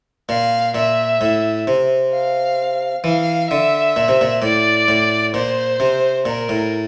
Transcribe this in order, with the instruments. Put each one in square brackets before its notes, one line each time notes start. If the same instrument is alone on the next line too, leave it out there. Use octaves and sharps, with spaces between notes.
[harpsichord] A#2 [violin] F5
[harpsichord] A#2 [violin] E5
[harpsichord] A2
C3
[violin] F5
[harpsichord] E3 [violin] F5
[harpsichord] D3 [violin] E5
[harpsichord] A#2
C3
A#2
[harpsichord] A2 [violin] D5
[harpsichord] A2
[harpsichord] A#2 [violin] C5
[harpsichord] C3
[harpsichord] A#2 [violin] A#4
[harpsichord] A2